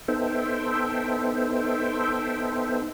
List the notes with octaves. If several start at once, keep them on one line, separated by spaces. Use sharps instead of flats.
B3 D#4 A4 C5 E5 G5